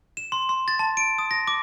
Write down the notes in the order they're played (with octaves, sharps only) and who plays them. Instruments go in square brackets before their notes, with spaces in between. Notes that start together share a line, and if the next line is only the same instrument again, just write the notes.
[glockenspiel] E7
C6
C6
A6
A5
D7
D#6
A#6
D6